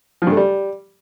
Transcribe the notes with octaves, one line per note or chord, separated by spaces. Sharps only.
F3
G2
A3
G3